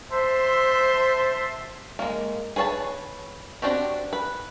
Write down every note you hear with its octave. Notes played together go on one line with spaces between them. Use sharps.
C5 E5 A5 C6
G#3 A#3
G#4 B4 C#5 G#5 A5
C4 D4 F#4 G4
B4